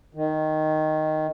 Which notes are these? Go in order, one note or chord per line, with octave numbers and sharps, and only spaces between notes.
D#3